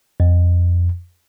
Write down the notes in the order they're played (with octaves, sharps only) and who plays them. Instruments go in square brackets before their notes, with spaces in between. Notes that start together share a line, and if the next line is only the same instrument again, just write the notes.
[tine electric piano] F2